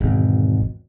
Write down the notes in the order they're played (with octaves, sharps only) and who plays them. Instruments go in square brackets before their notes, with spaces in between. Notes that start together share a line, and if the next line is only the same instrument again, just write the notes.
[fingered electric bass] G#1 E2 B2